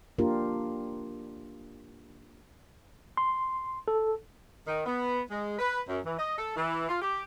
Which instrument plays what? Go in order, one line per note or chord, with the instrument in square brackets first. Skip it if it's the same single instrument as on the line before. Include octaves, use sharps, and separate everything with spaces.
[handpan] A#3 D4 F4 G4 A#4
[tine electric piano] C6
A4
[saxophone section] D#3
B3
G#3
B4
F#2
E3
D#5
A4
E3
F4
G4